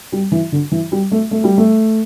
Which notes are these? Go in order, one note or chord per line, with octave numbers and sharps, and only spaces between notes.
G3
E3
D3
E3
G3
A3
A3
G3
A3